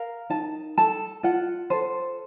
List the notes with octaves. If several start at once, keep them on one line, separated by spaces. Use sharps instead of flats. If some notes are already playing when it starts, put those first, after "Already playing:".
Already playing: A#4 F5
D#4 A5
A4 A5
F4 F#5
A4 C5